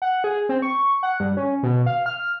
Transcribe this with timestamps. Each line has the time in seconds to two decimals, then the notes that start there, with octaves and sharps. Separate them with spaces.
0.02 F#5
0.24 G#4
0.49 C4
0.62 C#6
1.03 F#5
1.20 G2
1.37 C#4
1.63 B2
1.86 F5
2.06 F6